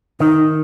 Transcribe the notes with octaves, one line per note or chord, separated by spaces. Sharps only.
D#3 D#4